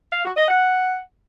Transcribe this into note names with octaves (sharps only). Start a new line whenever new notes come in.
F5
F#4
D#5
F#5